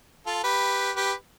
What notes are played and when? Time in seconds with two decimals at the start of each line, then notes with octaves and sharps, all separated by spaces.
0.26 F4 A4
0.44 G4 B4
0.96 G4 B4